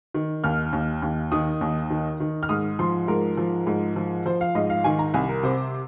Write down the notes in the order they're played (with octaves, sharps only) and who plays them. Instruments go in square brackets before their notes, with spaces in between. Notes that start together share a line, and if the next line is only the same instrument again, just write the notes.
[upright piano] D#3
D#2 F6
D#2
D#2
D#3 D#6
D#2
D#3
D#3
F6
G#2 D#6
F3 C6
G#2 A#4
F3
G#2
F3
F3 C5
F5
G#2 D#5
F5
D#3 G#5
A#5
C2 G#5
A#4
C3 C5